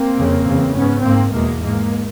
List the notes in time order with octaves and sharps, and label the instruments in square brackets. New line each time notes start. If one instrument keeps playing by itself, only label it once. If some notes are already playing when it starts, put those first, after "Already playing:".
Already playing: [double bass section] A#3 C4
F2 C#3
E2 C#3
G#2 B3 C#4
G#2 A#3 C4
E2 B2 G#3 A#3
G#2 G#3 A#3